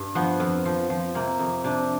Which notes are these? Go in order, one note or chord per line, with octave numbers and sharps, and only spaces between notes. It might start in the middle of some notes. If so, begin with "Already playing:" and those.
Already playing: G2
F3 B3
F2
F3
F3
C3 A#3
F2
C3 D4